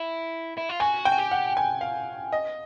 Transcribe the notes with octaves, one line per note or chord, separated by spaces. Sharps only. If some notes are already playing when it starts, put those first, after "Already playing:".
Already playing: E4
E4
F4
F#4 G#5
G5
F#4
G4
F#5
G#5
F5
D#5